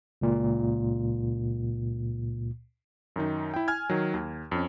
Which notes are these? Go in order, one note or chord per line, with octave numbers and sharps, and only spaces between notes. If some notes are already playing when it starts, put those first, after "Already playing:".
C#2 A#2
F#2 D#3 D#4
E4 G5
G#5 F6 G#6
D#3 F#3
D#2
F2 C#4